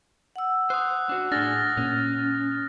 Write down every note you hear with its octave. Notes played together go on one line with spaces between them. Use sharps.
F#5 E6
C5 D#6 F#6
D4 F#4
A2 D4 G#4 F6 A6 A#6
A#2 C#4